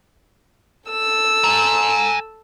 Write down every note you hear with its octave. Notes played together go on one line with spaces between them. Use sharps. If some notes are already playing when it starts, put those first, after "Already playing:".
A4 E6
G#5 A#5